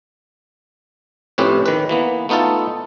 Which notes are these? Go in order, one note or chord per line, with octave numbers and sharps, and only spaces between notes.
F2 A2 C4 C#4 G4 B4
D#3 B4
E3 A#3 B3
A3 B3 D#4 F4 A4